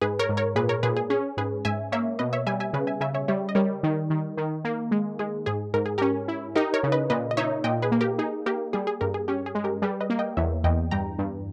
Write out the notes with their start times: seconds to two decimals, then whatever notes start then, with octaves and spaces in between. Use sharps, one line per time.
0.01 G#2 G#4 B4
0.19 A#4 C#5
0.29 G#2
0.37 A#4 C#5
0.55 A#2 G#4 B4
0.69 A#4 C#5
0.83 A#2 G#4 B4
0.97 G#4
1.10 C#4 G#4
1.37 G#2 G#4 B4
1.65 G#2 E5 G#5
1.92 A#3 C#5 E5
2.19 B2 B4 D#5
2.33 C#5 E5
2.47 G3 E5 G#5
2.60 E5 G#5
2.73 C#3 G#4 B4
2.87 E5 G#5
3.00 C#3 E5 G#5
3.14 C#5 E5
3.28 G3 C#5 E5
3.49 D#5
3.55 G3 A#4 C#5
3.83 D#3
4.10 D#3
4.37 D#3
4.64 A#3
4.91 G#3
5.19 G#3 G#4
5.46 G#2 G#4
5.74 G#2 A#4
5.86 G#4
5.98 C#4 G4 A#4
6.28 E4
6.56 D#4 G4 A#4
6.74 A#4 C#5
6.83 C#3
6.92 B4 D#5
7.10 A#2 B4 D#5
7.31 D#5
7.37 D#4 C#5 E5
7.64 A#2 D#5 G5
7.82 G#4 B4
7.92 A#3
8.01 G4 A#4
8.18 D#4 G#4
8.46 A#3 G4 A#4
8.73 G3 G#4
8.87 G#4
9.01 G2 G4 A#4
9.14 G#4
9.28 C#4 G4
9.46 G#4
9.55 G#3
9.64 G4 A#4
9.82 G3 G#4 B4
10.01 B4 D#5
10.10 A#3
10.19 D#5 G5
10.37 E2 C#5 E5
10.64 E2 D#5 G5
10.91 G2 G5 A#5
11.19 G2